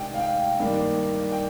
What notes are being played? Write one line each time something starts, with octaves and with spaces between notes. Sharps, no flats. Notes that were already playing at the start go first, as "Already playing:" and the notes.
Already playing: C3 D#3 G#3 D4 G5
F5
G5
G2 D#3 A#3 D4
G5